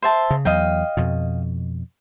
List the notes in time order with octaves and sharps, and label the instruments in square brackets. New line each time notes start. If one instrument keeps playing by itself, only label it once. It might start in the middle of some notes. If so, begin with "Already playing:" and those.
[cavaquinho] C5 E5 A5
[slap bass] C#3
[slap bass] E2 F#3 [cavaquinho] D#5 F5 G5
[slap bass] F2 B2